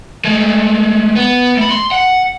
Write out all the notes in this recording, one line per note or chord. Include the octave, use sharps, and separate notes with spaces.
G#3 A3
B3
A3 B5
C6
F#5